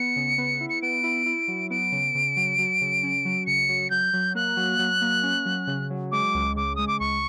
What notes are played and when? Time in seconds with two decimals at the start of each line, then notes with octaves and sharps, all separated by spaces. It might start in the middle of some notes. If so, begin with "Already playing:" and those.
Already playing: B3 C#7
0.16 C#3
0.38 B3
0.60 E4
0.70 C#7
0.82 B3 D7
1.03 E4
1.26 E4
1.48 F#3
1.70 B3 D7
1.92 C#3
2.15 C#3
2.36 F#3
2.59 F#3
2.81 C#3
3.03 C#4
3.25 F#3
3.46 C#3 C#7
3.69 F#3
3.90 F#3 G6
4.13 F#3
4.35 A#3 F#6
4.57 F#3
4.79 F#3
5.01 A#3
5.23 C#4
5.45 F#3
5.67 C#3
5.90 F#3
6.12 G#3 D6
6.34 C#2
6.56 C#3 D6
6.76 G#3 D#6
6.87 D6
7.00 C#2 C#6